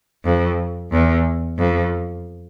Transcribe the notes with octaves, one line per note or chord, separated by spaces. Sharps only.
F2
E2
F2